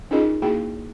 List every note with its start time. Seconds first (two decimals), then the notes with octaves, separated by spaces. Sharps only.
0.11 C#4 D#4 F4 G#4 A#4 D#5
0.42 A#3 E4 F#4 G#4 G5